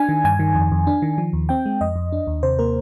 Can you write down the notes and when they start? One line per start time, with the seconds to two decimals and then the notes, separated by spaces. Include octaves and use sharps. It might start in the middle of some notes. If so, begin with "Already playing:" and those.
Already playing: D4 G#5
0.09 D#3
0.24 G2 G#5
0.39 D#3
0.55 F2
0.72 F2
0.87 D4
1.02 D#3
1.18 F3
1.33 D#2
1.49 C4 G5
1.66 G#3
1.81 F2 D#5
1.96 F2
2.12 D4
2.27 D#2
2.43 C3 C5
2.59 A#3 A#4